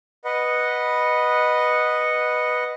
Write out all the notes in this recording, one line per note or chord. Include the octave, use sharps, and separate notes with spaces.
B4 D#5 F#5